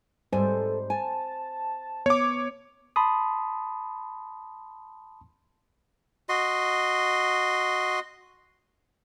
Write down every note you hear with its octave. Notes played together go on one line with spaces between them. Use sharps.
G#2 G3 A4 C5 G#5
G#5 A5
B3 C#5 D6
A5 B5 C6 D#6
F#4 D#5 C6